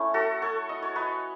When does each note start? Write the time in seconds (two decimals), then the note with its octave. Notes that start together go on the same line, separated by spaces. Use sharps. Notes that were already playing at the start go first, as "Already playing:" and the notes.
Already playing: A3 C#4 E4
0.14 F#4 A4
0.42 A4 C#5
0.69 D#5
0.82 C#5
0.96 B4 D#5